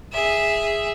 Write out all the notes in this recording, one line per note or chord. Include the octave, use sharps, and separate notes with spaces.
G#4 E5